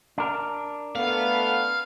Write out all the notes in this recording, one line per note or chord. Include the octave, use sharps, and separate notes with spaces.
D4 A#4
A3 B3 F5